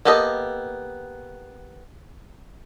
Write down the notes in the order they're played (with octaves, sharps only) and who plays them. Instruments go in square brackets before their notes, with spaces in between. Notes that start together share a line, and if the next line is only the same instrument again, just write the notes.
[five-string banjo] A#3 B3 G4 A4 D#5